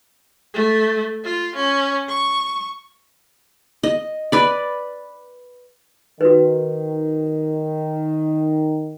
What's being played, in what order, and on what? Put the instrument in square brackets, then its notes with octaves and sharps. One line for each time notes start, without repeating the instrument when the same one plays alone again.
[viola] A3
F4
C#4
C#6
[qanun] D#5
B4 D5
[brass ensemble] D#3 [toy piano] F#4 B4